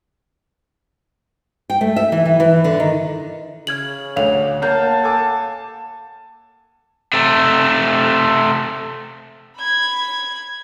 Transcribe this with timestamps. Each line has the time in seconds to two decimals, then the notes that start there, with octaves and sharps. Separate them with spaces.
1.70 G5
1.81 A3
1.96 E5
2.12 E3
2.26 E3
2.40 E3
2.64 D3
2.80 D#3
3.67 C#3 F6 G#6 F#7
4.16 D2 D3 C#5 F5 F7
4.62 A#3 C#5 F5 F#5 A5 G6
5.03 A4 G#5 D6
7.13 C3 A3
9.57 B5 G#6